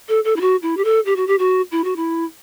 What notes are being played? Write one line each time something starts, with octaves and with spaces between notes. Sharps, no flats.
A4
A4
E4
F#4
E4
G4
A4
G4
F#4
G4
F#4
E4
F#4
E4